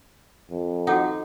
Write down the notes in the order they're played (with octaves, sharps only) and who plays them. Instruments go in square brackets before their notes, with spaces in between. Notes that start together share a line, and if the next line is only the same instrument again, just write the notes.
[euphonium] F2
[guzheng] D#4 [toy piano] F#4 A4 F#5